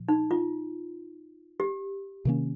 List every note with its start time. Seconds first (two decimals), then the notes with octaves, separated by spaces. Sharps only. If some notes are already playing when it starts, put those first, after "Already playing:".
Already playing: A#2 F3
0.08 D#4
0.31 F4
1.60 G4
2.25 C3 D#3 A#3 C#4